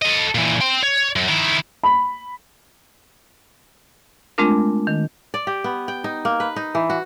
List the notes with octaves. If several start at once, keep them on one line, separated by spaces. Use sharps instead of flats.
A4 D#5
A#2 E3
G5 C6
C#5
F#2
D#3 E4
B5
G#3 A3 C4 D4 F4 A#4
D#3
D5
G4
B3
G5
D#4
A#3
B4
D#4
E3
F#4